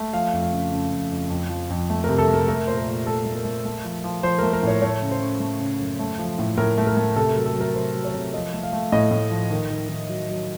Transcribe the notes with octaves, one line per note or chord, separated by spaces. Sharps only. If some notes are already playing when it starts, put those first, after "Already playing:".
Already playing: A3
F3 F5
F2
F5
C#3
C#3
F2
F2
F2
F3
F2
A3
A#4
C3
A4
A3
A#4
A3 A#4
A#2 C5
A#4
A#2
A3 A4
A3
A#4
A3
A3
F3
F3
F3 C5
A3 A#4
A#4
A2 C#5
A3 C#5
C#3
C5
C#3
A3
C#3
F#2
A3
F3
A2
A2 A#4
A3
A#4
A3
C3 A4
F#3 A#4
A4
F#3 A#4
C3 C5
F#3
C#5
C3
F3 D#5
A3
F5
A3
A2 D#5
A2
F3
D#3
D#3
D#3
F#3
F#3